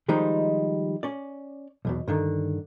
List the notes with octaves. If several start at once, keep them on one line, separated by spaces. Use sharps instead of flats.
D#3 F3 G3 G#3 D#4
C#4 D5
B1 E2 B2
G2 D3 D#3